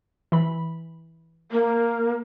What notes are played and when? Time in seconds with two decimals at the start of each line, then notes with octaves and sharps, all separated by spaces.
0.32 E3 B5
1.52 A#3